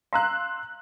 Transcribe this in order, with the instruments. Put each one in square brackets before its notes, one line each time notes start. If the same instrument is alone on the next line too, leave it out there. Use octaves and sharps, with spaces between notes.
[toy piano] F5 A#5 [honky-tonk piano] C6 E6 F#6